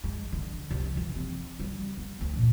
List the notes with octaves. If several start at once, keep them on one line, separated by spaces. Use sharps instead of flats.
G#3
D3
C2
E3
C4
G3
B3
D2
A#2